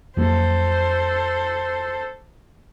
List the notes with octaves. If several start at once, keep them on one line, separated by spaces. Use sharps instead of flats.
F2 F#3 A#3 A4 C5